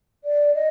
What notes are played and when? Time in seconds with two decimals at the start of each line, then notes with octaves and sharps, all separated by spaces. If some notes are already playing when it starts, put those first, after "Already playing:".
0.24 D5
0.54 D#5